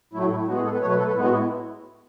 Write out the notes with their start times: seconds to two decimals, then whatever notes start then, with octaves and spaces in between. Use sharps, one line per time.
0.13 A2 F#3 A3 E4
0.31 E4
0.47 A2 G#3 B3 F#4
0.56 G#4
0.65 A4
0.73 B4
0.81 B2 F#3 A3 C#5
0.90 B4
0.99 A4
1.07 B4
1.15 A2 G#3 B3 E4
1.24 F#4
1.33 E4